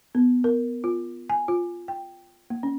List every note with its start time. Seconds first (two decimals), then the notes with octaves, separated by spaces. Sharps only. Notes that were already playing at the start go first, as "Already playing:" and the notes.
0.15 B3
0.44 A#4
0.84 F4
1.29 G#5
1.48 F4
1.88 G5
2.50 A#3
2.63 C#4